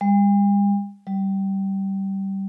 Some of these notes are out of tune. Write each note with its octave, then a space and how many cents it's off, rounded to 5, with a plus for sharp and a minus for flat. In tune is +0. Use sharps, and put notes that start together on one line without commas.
G3 +45
G3 -15